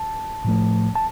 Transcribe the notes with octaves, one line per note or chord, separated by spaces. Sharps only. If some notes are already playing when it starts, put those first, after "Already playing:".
Already playing: A5
A2 F3 A3
A5